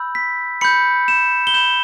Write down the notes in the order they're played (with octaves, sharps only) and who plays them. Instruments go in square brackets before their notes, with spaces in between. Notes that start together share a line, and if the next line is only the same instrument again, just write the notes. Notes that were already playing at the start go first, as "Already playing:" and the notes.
Already playing: [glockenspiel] B5 E6 G6
B6
B5 G6 C#7
E7
G7
B5 G6 E7